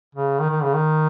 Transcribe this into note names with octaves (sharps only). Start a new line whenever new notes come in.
C#3
D#3
D#3
C#3
D#3